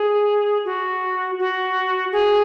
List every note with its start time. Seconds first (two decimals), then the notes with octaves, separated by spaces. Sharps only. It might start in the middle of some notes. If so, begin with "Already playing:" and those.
Already playing: G#4
0.65 F#4
1.39 F#4
2.12 G#4